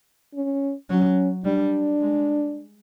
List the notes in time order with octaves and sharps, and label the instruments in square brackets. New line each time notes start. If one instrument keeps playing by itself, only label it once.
[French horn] C#4
[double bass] F#3 [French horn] C#4
[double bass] G3 [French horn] D4
[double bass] G#3